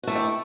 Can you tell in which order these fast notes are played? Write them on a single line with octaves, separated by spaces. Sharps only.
F#4 A3 G4 E4